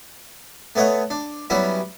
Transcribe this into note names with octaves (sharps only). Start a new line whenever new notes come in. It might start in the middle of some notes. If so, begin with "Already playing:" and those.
A3 B3 C#5 D#5 F#5
D4
F#3 G3 B3 C#4 E4